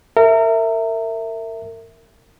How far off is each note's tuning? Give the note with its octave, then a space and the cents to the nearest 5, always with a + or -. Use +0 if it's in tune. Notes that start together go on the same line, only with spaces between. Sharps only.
A#4 -35 E5 +0